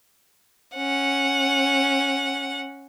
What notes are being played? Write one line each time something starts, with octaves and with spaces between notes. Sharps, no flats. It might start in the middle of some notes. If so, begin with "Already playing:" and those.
C#4 F#5